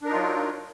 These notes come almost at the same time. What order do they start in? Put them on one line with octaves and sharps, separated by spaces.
D4 A#4 D#4 F4 F#3